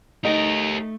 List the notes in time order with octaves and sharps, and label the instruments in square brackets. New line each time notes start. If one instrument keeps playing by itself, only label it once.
[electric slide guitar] A3 [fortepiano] D#4 [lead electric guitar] G4 A#4